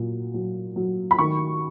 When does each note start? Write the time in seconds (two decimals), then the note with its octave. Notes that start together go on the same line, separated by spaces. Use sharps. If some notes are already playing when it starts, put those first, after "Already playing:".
Already playing: A#2 F#3
0.34 F#3
0.76 F#3
1.11 B5
1.19 D#3 C#6